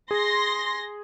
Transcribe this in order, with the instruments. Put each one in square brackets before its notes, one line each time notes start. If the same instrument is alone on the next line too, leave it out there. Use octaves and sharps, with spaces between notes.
[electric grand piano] G#4 [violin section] C6 A#6